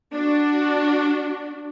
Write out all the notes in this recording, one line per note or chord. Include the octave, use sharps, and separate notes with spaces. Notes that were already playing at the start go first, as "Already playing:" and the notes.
D4 F#4